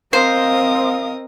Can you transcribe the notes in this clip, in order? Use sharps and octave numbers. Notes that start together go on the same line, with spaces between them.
C4 A#4 C5 D#5 F5 D#6